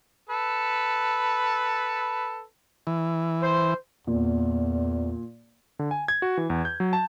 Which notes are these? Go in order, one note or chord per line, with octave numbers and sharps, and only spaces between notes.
A4 B4
E3
C5
E2 A#2
D3
G#5
G#6
F#4
E3
E2
G6
F#3
A5